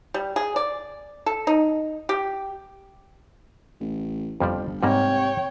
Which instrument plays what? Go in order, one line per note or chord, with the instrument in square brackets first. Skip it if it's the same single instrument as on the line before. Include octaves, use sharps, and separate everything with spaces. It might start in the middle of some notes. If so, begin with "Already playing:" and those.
[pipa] G3
G#4
D5
A4
D#4
G4
[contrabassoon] A1
[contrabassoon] G1 [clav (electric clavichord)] F2 F3 G3
[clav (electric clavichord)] G#2 G3 A#3 [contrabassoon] C3 [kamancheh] C#5 G5